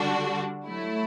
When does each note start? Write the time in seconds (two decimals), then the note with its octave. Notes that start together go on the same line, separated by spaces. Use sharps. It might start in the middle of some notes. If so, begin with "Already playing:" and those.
Already playing: D3 G3 D4 F#4
0.67 F#3 A3 E4